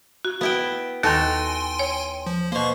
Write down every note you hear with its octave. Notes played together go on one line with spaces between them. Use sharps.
F#4
B3 E4 G5
D#2 D#3 F#4 A4 G5 G#5 C6
C#5
F3
B2 A#3 C5 C#6